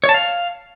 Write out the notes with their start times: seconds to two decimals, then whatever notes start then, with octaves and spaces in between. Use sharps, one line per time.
0.04 C#5
0.09 A5
0.14 F5